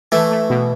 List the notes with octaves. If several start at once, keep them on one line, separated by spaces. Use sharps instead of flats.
E3 A3 E4
A3
B2